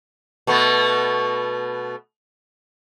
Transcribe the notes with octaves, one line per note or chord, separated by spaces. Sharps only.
B2 A3 B3